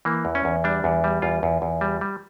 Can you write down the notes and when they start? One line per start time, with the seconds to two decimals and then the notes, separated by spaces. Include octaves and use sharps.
0.05 E3 A#3
0.25 E2
0.35 C#4
0.45 E2
0.64 G3 D4
0.84 E2
1.04 G3
1.22 E2 F4
1.43 E2
1.62 E2
1.81 G3
2.01 G3